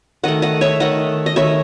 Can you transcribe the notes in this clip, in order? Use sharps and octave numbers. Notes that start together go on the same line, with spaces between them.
D#3 A3 D#5 F#5
D#5 F#5
C#5 E5
D#3 A3 D#5 F#5
D#5
D#3 A3 C#5 E5